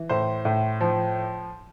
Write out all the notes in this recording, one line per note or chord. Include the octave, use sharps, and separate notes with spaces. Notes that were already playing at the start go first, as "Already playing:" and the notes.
Already playing: E3
A2 C5
A2
F3